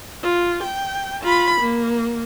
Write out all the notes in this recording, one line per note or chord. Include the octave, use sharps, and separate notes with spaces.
F4
G5
F4 B5
A#3